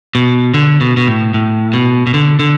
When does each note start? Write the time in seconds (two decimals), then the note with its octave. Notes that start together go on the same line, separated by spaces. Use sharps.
0.15 B2
0.54 D3
0.81 B2
0.97 B2
1.07 A2
1.34 A2
1.73 B2
2.07 B2
2.14 D3
2.39 D3